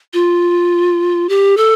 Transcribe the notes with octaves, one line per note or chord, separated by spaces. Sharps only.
F4
G4
A4